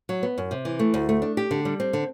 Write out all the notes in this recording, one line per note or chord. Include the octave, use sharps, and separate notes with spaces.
F#3
B3
F#2
C3
E3
A3
D2
A3
D4
G4
D3
G3
C4
D3